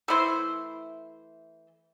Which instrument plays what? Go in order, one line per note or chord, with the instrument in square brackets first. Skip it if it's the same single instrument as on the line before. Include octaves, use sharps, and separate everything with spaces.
[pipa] E3 A3 E4 C5